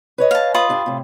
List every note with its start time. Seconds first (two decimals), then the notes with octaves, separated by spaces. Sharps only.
0.18 B4 C#5 D#5
0.31 F5 A5
0.54 F4 B5 D#6
0.69 G2 G3 D4
0.86 A2 C3